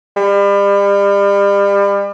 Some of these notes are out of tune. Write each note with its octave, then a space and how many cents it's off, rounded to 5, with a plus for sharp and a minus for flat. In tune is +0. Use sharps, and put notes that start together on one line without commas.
G3 +35